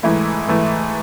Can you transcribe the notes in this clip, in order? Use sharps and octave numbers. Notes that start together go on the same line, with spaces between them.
G#2 E3 A3 E4
G#2 E3 A3